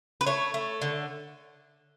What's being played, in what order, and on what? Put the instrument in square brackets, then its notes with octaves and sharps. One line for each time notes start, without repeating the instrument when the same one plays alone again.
[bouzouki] B4
A3 C#5
A3
D3